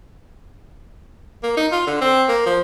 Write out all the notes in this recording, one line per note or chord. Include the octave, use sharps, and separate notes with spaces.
A#3
D#4
F4
D3
C4
A#3
F3